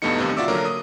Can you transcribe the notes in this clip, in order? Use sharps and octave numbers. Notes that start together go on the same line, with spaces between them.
E2 G2 B2 A3 D#4 C#7
G2 C3 D#3
F4 F#4 D5 E5 D6 E6
D3 F#3 A#3 A#4
D#6